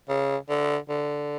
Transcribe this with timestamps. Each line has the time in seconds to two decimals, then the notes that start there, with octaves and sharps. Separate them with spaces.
0.09 C#3
0.49 D3
0.89 D3